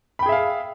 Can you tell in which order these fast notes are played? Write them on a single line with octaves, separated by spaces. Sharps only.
B5 G5 G#4 E5 F5